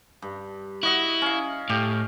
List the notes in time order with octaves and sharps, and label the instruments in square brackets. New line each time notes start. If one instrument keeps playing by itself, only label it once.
[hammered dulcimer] G2
[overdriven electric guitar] E4 [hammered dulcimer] F#4 D#5 F#5
[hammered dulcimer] C#4 F5
[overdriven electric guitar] A2 [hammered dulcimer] G4